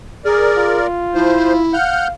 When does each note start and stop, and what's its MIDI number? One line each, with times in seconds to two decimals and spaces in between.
0.25 0.79 68
0.25 0.87 70
0.25 0.87 74
0.57 1.61 65
1.14 1.53 53
1.14 1.75 64
1.14 1.53 72
1.73 2.12 77
1.73 2.08 78
1.73 2.08 89
1.73 2.08 91